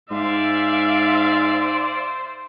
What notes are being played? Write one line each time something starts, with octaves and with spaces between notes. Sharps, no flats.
G#2 C5 D5 E5 F5